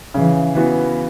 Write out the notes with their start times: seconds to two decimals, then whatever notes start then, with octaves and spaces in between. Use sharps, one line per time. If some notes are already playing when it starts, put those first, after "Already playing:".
0.14 C#3 E3
0.55 E3 B3 F#4